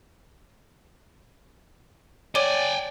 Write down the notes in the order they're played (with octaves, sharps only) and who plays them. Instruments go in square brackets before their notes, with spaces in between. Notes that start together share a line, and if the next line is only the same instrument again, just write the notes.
[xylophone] C#5 D6 G7 [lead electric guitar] D5 [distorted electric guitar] G5 G#5